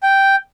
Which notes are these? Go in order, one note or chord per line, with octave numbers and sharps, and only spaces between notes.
G5